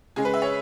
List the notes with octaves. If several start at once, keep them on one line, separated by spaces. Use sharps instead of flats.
C#3 G#3 G#4
B4
E5
C#5